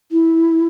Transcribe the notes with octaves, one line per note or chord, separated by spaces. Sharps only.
E4